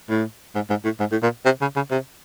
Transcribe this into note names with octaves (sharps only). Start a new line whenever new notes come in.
A2
G#2
G#2
A2
G#2
A2
A#2
C3
C#3
C#3
C3